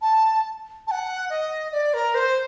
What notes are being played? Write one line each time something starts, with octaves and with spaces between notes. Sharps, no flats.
A5
A5
F#5
D#5
D5
A#4
C5